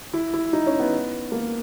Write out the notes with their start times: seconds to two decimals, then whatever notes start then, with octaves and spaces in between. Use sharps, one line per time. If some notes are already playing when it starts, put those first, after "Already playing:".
0.14 E4
0.34 E4
0.53 D#4
0.67 C#4
0.79 B3
1.32 A#3